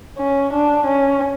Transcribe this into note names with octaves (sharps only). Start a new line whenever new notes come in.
C#4
D4
C#4